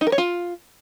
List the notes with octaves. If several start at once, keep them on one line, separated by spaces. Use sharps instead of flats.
D#4
A#4
C#5
F4